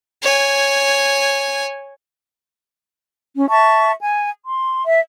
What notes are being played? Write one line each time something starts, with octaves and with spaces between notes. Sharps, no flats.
C#5 G#5
C#4
E5 A5 C#6
G#5
C6
E5